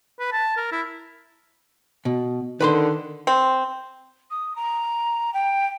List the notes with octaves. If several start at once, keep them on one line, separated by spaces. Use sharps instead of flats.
B4
A5
A#4
E4
B2
D3 D#3 B4 B5 C6
C4
D#6
A#5
G5